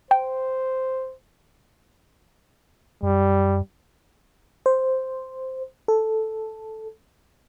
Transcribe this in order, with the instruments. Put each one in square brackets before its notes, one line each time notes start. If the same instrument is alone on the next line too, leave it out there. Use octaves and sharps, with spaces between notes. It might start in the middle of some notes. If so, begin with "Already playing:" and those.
[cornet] C5 [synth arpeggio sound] G5
[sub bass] F#2 [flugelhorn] G3
[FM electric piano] C5
A4